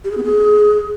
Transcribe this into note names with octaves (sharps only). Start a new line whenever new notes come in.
G4
G#4
B3
G#4